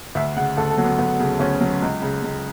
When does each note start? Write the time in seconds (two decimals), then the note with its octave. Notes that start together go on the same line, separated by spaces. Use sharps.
0.15 D2 E5
0.36 C#3 F#5
0.57 D2 A4
0.70 A4
0.78 F#3
0.84 B3
0.99 D2 B3
1.19 C#3
1.40 D2 C#4
1.60 F#3
1.82 C#2
2.02 C#3
2.22 C#2